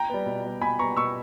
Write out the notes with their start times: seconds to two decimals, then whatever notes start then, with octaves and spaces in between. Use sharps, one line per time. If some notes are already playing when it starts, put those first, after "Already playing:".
Already playing: G5 A#5
0.10 G3 B3
0.26 B2
0.44 G3 B3
0.61 B2 G#5 B5
0.79 B3 A#5 C#6
0.83 G3
0.97 B2 C#6 E6